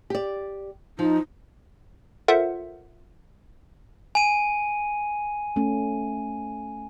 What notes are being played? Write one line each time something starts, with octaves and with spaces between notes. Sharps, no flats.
G4 D5
F3 D#4
F4 A4 A#4 C5 E5 F#5
G#5 D#7
A3 C#4